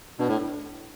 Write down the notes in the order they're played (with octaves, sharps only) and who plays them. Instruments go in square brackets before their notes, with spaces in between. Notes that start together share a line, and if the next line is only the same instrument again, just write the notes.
[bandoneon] B2 [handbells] D4
[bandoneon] A2